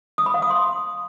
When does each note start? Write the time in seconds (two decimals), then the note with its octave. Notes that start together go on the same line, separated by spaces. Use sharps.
0.18 D#6
0.26 B5
0.34 F5
0.42 D#6
0.50 C6